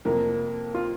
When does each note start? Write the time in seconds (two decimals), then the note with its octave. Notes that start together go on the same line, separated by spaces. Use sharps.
0.05 F2 C3 F3 A#3 A#4
0.75 F4